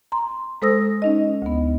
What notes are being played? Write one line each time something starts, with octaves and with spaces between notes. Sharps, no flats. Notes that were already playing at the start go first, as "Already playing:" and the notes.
A#5 C6
G#3 A4 C5 D#6 E6 A#6
C#4 D#4 D#5
D2 B3